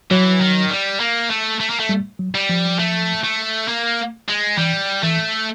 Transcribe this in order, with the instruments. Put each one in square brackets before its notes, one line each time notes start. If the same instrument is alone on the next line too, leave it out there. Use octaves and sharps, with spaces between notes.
[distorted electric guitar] E3 [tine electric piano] F#3
[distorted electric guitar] D#3
G3
A#3
A3
A3
A#3
A3
[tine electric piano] G3
F#3
[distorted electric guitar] G3
[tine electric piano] F3
[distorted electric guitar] A3
A3
A#3
G#3
[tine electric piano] E3 [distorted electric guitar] G3
[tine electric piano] E3 [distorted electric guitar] A3